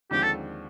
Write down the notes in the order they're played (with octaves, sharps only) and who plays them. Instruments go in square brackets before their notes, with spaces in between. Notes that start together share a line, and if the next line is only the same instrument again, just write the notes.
[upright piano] D#2 D3 F3 G#3 C4 [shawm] G4
[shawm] A4